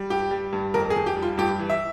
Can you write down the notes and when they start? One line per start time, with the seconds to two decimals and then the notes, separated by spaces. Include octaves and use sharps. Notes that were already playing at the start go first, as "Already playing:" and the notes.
Already playing: G3
0.10 G2 G4
0.31 G3
0.53 G2
0.74 F2 A#4
0.90 G#4
0.96 F2
1.06 G4
1.16 G3
1.22 F4
1.38 G2 G4
1.59 E3
1.70 E5